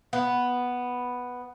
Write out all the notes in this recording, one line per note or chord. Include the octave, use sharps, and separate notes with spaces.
B3